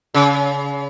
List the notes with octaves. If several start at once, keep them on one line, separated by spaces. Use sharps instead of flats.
C#3